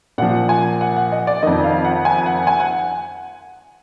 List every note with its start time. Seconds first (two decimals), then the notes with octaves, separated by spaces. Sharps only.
0.18 A#2 F3 F#5
0.49 G#5
0.81 F#5
0.96 F#5
1.12 D#5
1.27 D5
1.42 F2 D#3 D#5
1.64 F5
1.84 F#5
2.05 G#5
2.26 F#5
2.47 G#5
2.60 F#5